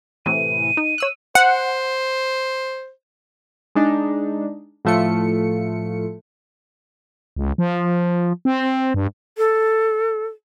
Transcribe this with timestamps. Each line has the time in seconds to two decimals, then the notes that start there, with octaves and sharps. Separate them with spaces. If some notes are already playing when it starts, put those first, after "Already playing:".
0.26 A2 C3 E3 D#7
0.77 D#4
0.98 C#5 E6 F#6
1.35 C5 F#5
3.75 G#3 D4 D#4
4.85 A2 F3 A3 F4 C#7
7.37 C#2
7.58 F3
8.45 C4
8.94 G2
9.38 A4